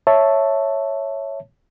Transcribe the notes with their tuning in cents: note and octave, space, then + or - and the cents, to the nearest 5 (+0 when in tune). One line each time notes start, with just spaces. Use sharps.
C#5 +0 E5 +0 A5 +0